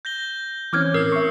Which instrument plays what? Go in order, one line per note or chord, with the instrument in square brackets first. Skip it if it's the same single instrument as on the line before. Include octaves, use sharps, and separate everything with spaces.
[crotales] G6 A#6 G7
[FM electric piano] E3 C4 C#4 [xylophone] D6 F6 G#6
[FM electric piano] A2 [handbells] A#4 [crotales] E6 C7
[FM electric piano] E5 C#6